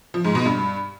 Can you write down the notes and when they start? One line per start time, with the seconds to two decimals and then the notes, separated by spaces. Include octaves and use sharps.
0.14 F3
0.24 G#2
0.35 B2
0.45 G2